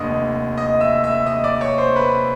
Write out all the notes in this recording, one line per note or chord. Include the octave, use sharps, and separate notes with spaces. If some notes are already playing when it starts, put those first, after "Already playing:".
Already playing: F1 D#2 D3 D#5 D#6
D#5 D#6
E5 E6
E5 E6
D#5 D#6
D5 D6
C#5 C#6
C5 C6
B4 B5